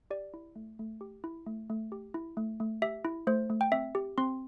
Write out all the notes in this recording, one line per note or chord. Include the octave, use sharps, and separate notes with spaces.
G4 D5
E4
A3
A3
G4
E4
A3
A3
G4
E4
A3
A3
G4 E5
E4
A3 C5
A3
G5
C4 E5
G4
C4 C6